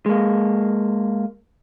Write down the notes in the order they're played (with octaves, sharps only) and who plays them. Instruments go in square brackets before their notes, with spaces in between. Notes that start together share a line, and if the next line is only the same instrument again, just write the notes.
[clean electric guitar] G#3 A#3